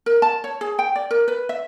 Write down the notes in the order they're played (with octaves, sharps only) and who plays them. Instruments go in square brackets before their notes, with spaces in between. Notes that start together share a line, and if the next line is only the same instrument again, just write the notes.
[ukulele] A#4
A5
C#5
G#4
G5
D5
A#4
B4
E5